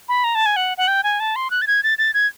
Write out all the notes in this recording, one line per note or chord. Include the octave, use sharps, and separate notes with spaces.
B5
A#5
A5
G#5
F#5
F#5
G5
G#5
A5
C6
F#6
A6
G#6
A6
A6
G#6